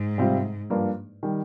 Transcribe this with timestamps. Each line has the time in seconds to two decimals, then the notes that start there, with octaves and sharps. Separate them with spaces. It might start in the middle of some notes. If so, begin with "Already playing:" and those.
Already playing: G#2
0.18 C3 G3 C4 F4
0.70 G2 F3 A#3 D4 F4
1.23 D#3 G3